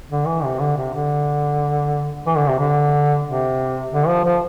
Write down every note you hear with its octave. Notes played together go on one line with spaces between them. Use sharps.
D3
E3
C3
D3
C3
D3
E3
D3
C3
D3
C3
D3
F3
F3